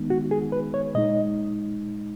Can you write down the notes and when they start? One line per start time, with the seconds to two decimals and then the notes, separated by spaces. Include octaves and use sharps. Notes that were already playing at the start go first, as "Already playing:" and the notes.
Already playing: D#3 G#3 B3 D#4
0.10 F#4
0.31 G#4
0.52 B4
0.74 C#5
0.95 A#2 G#3 D#4 D#5